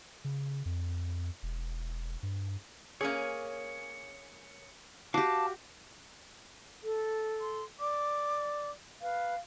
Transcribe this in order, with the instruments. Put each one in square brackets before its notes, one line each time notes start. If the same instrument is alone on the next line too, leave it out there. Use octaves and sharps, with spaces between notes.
[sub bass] C#3
F2
E1
G2
[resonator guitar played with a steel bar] A#3 C#4 G#4 [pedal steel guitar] C#5 G#5
[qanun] F#4 G4 [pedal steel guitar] F5 D6 [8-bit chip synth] A5
[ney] A4
[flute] C6
[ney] D5 [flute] D6
[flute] B4 [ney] F5